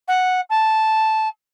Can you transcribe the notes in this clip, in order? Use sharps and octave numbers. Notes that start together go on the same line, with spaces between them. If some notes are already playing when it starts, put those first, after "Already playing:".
F#5
A5